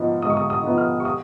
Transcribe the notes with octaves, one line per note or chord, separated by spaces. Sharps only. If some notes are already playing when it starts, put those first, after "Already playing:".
Already playing: G#2 F3 B3 D#4
G#2 D#6
C#6
D#6
D#6
F3 B3 D#4
F6
C#6
D#6